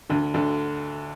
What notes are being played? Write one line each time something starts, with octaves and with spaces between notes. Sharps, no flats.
D2 D3
D2 D3